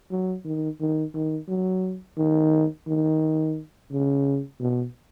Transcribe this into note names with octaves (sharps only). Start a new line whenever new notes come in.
F#3
D#3
D#3
D#3
F#3
D#3
D#3
C#3
B2